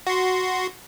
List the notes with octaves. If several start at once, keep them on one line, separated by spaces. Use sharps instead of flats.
F#4 C6